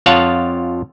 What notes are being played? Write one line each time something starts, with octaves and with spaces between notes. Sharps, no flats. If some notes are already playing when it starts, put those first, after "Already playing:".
F2 F4 C#5 F5 F#5 A5